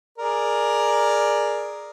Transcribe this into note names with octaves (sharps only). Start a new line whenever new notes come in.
G#4 A#4 D5